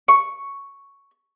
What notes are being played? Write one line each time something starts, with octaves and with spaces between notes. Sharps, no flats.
C#6